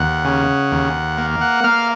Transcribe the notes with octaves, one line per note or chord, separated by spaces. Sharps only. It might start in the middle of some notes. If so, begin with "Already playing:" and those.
Already playing: D#2 F#5
C#3
D#2
A#3
F#5
A#3 F5